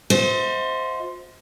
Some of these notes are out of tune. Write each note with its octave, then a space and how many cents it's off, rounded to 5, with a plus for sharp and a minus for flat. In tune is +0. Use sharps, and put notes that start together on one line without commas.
F4 +45 C5 -5 D#5 +45